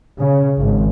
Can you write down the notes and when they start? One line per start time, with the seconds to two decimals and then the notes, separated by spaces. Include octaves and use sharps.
0.18 C#3
0.56 G#1